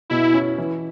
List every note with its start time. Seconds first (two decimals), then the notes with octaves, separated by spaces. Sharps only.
0.10 B2 E4
0.34 C#4
0.58 E3